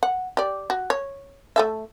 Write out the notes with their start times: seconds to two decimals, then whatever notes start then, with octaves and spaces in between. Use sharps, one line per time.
0.03 F#5
0.37 G4 D5
0.70 F#4
0.90 C#5
1.56 A3 A4 E5